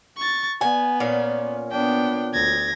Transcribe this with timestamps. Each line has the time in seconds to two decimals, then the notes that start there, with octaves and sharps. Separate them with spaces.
0.17 C#6 A6
0.61 B3 G#5
1.00 A#2 C#4 F5
1.72 B3 D4 G5
2.34 D2 G#6 A#6